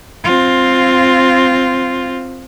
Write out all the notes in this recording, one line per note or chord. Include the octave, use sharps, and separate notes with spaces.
C4 F4